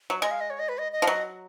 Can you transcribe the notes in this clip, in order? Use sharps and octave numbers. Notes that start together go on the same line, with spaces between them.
F#3
G#3 D#5
F5
D#5
C#5
D#5
B4
D#5
D#5
F3
F#3